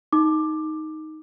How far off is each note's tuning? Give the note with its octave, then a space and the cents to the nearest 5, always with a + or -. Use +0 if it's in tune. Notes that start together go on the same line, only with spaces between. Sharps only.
D#4 +10 D6 +15